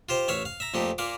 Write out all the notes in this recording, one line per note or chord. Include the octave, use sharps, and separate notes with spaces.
F4 G4 C5
A1 C#5 E5 F5
F5
E5 A#5
F2 A#2 A3 D#4 G4
A#2 A#3 F5 D6